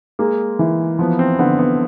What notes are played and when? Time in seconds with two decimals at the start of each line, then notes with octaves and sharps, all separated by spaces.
0.19 G#3 A#3
0.59 E3
0.99 F3 B3
1.19 C4
1.39 D3 B3
1.59 B3